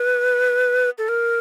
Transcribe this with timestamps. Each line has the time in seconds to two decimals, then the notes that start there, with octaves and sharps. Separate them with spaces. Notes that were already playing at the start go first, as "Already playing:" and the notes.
Already playing: B4
0.98 A4
1.09 A#4